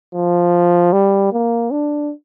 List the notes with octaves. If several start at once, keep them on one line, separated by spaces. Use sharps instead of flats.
F3
G3
A#3
D4